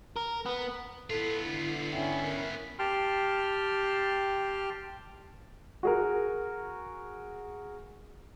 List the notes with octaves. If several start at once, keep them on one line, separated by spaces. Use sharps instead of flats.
A#4
B3
B3 E4 F4 A4
D3
C#4 E4 G5
A#4
G4 G5 A5 C6 F6
F#4 G#4 A#4